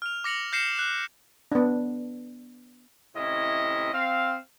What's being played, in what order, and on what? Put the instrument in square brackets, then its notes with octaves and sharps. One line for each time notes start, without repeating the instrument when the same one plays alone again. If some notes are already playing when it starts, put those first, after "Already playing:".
[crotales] F6 F7
D6 A#6 C#7 F7 F#7
F6 G6 A#6 C7 C#7 E7
F#6
[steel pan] B3 D4
[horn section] A2 C3 C#4 E4 D#5
C4 F5